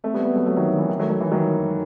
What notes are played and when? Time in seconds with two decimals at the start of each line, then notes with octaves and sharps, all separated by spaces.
0.04 A3 C4
0.14 G3 B3
0.24 G3 B3
0.35 F#3 A3
0.46 F#3 A3
0.57 D#3 F#3
0.68 E3
0.78 E3
0.89 D#3
1.00 F#3 A3
1.10 F#3 A3
1.20 E3
1.32 D#3 F#3